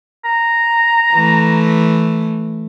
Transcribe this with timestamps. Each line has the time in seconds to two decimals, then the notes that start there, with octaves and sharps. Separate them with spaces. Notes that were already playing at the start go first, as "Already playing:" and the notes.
0.25 A#5
1.13 E3 A3